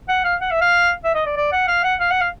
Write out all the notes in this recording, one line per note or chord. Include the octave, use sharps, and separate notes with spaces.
F#5
F5
F#5
E5
F5
E5
D#5
D5
D5
F#5
F5
F#5
F5
F#5
F5